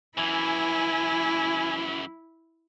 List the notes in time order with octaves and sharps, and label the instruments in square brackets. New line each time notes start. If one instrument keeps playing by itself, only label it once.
[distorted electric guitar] F#2 E3 [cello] E4 [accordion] G#5